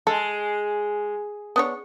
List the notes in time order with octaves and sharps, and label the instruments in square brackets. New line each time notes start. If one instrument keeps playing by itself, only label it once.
[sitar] G#3 [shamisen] A4
[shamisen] B3 D4 C#5